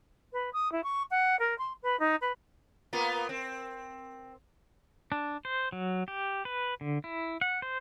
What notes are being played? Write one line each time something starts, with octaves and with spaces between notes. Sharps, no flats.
B4
D#6
E4
C#6
F#5
A#4
C6
B4
D#4
B4
A#3 B3 F4
C4
D4
C5
F#3
G4
B4
D3
E4
F#5
C5